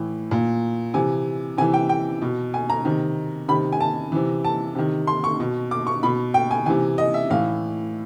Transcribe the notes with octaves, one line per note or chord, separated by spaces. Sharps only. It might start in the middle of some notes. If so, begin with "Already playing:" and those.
Already playing: A2 E3
A#2
C3 E3 G#5
C3 E3 G#5
G5
G5
B2
G#5
A#5
C3 D#3
C3 D#3 B5
G#5
A5
C3 E3
A5
C3 D#3
C6
C#6
B2
D6
C#6
B2 B5
G5
G#5
C3 E3 G#5
D#5
E5
A2 E3 F5